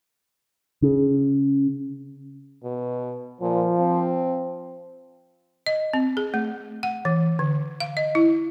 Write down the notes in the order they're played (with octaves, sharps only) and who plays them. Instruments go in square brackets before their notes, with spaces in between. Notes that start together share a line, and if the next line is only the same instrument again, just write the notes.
[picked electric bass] C#3
[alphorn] B2
[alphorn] A#2 [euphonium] F3
[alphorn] C4
[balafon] D#5
C4
G#4
A3
F#5
E3
D3
F5
D#5
E4